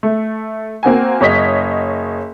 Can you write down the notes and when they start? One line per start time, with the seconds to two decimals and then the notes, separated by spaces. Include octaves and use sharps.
0.03 A3
0.83 A#3 C4 F#4 G#5
1.20 F#1 C#5 D#5 B6